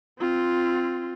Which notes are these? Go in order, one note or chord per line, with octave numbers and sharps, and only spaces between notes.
C4 F4